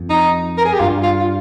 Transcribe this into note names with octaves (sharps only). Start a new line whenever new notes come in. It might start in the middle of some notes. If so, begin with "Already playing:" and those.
Already playing: F2
D#4
A#4
G#4
G4
G2 F4
F4
F4